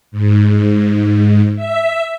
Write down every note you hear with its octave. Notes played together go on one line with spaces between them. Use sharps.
G#2
E5